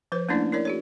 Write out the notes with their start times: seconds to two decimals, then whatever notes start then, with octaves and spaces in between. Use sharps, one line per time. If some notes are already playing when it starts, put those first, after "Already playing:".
0.12 F3 B4 C5
0.29 A3 A#3 C#4 D4 E4 D5
0.52 E4 A#4 C#5 D5
0.65 F#4 G#4 C#5